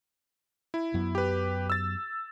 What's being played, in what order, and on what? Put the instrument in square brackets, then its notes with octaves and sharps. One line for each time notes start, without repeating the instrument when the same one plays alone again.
[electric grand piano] E4
[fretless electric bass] F#2 F#3 B3
[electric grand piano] G4 B4
E6 A6